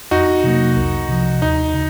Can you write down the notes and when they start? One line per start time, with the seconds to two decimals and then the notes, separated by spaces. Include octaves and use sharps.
0.11 F2 D#4 F#4
0.44 C3 F#3 A#3
0.77 C2
1.09 C3 F3
1.42 D#2 D#4
1.74 C#3